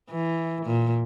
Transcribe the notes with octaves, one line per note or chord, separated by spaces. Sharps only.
E3
A#2